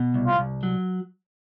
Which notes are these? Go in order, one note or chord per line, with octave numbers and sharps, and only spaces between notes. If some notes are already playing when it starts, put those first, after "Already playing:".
Already playing: B2
C2
F4
C2
F#3